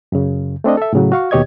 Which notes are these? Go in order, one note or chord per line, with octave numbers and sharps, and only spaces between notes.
F#2 C#3
A3 C4 D4 D#5
A4 E5
A2 C#3 F#3
F#4 F5 C#6
D#2 B2 G4 C#5 D#5 G#6